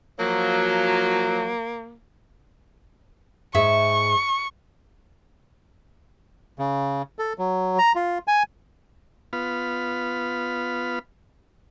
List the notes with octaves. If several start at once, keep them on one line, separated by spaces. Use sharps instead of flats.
F3 F#3 A#3
G#2 G#4 E5 C#6
C#3
A4
F#3
A#5
F4
G#5
B3 F4 B5 F6